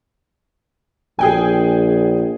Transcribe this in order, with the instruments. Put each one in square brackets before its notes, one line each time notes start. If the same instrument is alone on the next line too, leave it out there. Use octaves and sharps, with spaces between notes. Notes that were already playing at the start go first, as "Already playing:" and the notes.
[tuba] A#1 [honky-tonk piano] G#4 G5 G#5